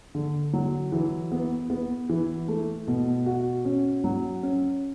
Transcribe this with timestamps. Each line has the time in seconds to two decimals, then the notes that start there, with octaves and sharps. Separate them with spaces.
0.15 D3
0.53 F#3
0.92 E3
1.32 B3
1.70 B3
2.09 E3
2.48 A3
2.87 B2
3.26 F#4
3.65 C#4
4.04 F#3
4.43 C#4